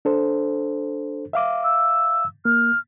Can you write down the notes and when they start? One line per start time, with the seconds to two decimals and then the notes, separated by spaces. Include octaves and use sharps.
0.05 D4 A4 C5
1.33 E5 F5 D6
1.64 E6
2.45 A#3 F6